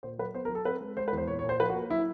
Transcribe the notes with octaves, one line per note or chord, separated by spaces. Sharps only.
A#2 C5
F#3 B4
B3 C5
A#4
F#3
A4
C4 B4
G#3
G#3 C5
B4
E2
C5
A#2 C#5
C#5
A#2
C5
F3 B4
F#4
A#3
F#3 E4